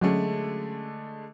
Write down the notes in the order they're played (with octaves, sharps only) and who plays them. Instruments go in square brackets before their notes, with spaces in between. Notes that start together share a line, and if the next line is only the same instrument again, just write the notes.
[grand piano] D3 G#3 A3 [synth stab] F#3 C#4